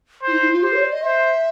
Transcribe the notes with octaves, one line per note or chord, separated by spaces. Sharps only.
E4 C5
D#4
E4
F4
G4 C5
C#5
D5
D#5
C5 E5